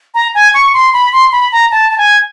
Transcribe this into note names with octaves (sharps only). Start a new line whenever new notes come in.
A#5
G#5
C#6
C6
B5
C6
B5
A#5
A5
A5
G#5